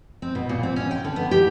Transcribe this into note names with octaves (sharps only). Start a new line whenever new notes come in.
C4
B2
A#2
C4
C#4
G5
D3
B3
G4